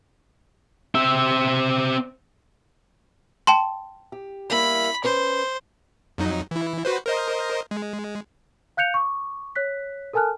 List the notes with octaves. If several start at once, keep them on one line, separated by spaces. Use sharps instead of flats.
C4 E5
G5 A5 C6
G4
G3 A#3 E4 B5
C#4 B4 C5 D5
F2 F#3 D#4
E3 E4
F#4 B4 C5
A#4 C5 D#5
G#3
F5 F#6 G6 C#7 F7
C#6 D6
C#5 F#6 B6
A4 A#4 G#5 A5 F6 F#6